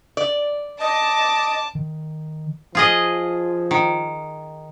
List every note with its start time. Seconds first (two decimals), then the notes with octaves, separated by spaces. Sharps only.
0.17 D5
0.80 D#5 A5 D6
1.75 D#3
2.75 F3 F4 G#4 D#5
3.71 D#3